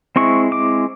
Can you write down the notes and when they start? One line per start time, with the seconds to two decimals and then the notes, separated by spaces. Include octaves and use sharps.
0.16 G#3 C4 E4 C#6
0.52 D6